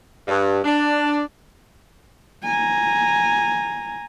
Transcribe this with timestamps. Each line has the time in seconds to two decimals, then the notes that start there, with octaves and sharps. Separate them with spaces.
0.28 G2
0.64 D4
2.44 G#5 A#5